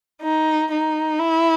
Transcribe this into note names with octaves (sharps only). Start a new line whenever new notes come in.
D#4
D#4
E4